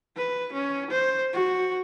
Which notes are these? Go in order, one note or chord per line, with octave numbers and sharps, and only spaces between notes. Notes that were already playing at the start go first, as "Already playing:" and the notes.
B4
C#4
C5
F#4